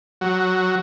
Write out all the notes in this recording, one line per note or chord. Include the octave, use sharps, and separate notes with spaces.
F#3